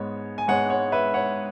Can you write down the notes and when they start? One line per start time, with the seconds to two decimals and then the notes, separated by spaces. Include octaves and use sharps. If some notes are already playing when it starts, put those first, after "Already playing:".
Already playing: G#2 G#3 B3 C#5
0.38 G#5
0.48 G#2 G#3 B3 C#5 F#5
0.70 C#5 F#5
0.92 B4 E5
1.14 C#5 F#5